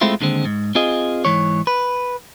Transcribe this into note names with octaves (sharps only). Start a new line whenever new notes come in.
G#3 A3 C4 E4 F4
D#2 D3 G#3 C4
G#2
C4 F4 G#4 D#5
G#2 E3 C#5
B4